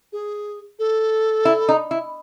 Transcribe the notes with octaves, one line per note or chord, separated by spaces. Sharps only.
G#4
A4
E4
D#4
E4